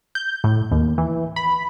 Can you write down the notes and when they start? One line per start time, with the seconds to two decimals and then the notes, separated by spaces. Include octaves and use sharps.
0.15 G6
0.44 A2
0.72 D#2
0.98 E3
1.36 B5